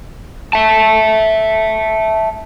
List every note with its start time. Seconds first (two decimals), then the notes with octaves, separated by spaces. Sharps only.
0.53 E5 A5